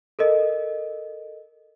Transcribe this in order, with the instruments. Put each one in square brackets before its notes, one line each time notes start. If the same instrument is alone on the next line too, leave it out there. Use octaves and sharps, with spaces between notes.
[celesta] A4 A#4 D#5